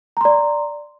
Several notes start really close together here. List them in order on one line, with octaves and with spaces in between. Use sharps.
A#5 C6 D5